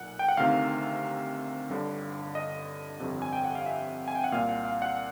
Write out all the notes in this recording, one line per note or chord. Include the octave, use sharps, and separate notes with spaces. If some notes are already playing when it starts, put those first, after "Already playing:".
Already playing: B1 A#2 F#5
G5
F#5
D2 C3 D#3 F5
G1 G2 D3
D#5
G1 F2 C3
G#5
G5
F#5
F5
E5
G#5
G5
F#5
C2 A#2 F5
F#5
F5
F#5